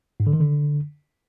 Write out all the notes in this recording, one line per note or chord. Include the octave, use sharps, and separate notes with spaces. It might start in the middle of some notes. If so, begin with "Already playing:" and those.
G#2
D3
D#3
D3